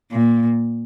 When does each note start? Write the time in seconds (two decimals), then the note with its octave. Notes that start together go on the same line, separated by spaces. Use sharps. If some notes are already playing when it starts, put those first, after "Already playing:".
0.12 A#2